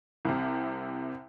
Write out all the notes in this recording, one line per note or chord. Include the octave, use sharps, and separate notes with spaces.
C2 C3